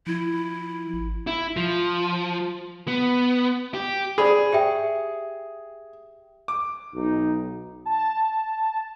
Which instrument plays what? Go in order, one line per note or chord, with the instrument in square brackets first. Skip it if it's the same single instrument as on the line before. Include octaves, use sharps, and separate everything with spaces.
[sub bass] F3 [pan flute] E4
[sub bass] G#1
[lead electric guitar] E4
F3
B3
G4
[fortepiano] G#4 [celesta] C5 D5 B5
[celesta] G4 E5 G5
[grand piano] D6
[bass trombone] B1 [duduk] D#4
[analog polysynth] A5